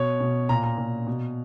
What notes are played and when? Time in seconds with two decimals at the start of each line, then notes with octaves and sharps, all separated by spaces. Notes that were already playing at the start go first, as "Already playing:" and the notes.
Already playing: B2 C#5
0.20 B2
0.49 A#2 A#5
0.64 A#5
0.78 A#2
1.07 B2